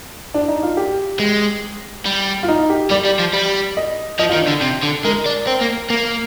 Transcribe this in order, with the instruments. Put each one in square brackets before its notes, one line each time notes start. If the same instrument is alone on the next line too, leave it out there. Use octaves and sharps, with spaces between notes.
[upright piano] D4
D#4
F4
G4
[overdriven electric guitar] G#3
G3
[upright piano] F4
D#4
G4
[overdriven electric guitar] G3 [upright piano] D5
[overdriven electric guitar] G3
F3
G3
[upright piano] D#5
[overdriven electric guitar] F3 [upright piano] D#5
[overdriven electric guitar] D#3 [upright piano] F4
[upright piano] D4
[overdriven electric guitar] D3
C3
D3
[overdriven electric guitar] G#3 [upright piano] A#4
[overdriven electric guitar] D4
C4
A#3
A#3